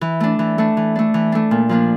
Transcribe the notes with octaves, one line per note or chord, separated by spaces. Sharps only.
E3
A3 D4
E3
A3 D4
E3
A3 D4
E3
A3 D4
A#2
F3 A#3 D4